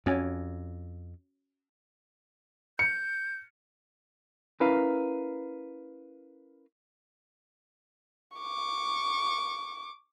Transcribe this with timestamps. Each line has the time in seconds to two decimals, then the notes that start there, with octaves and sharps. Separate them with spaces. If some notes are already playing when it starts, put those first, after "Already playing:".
0.06 F2 C#4 F#4 G#5
2.79 G6 C#7
4.60 C#4 E4 A#4 B4 F5 A#5
8.37 C#6 D6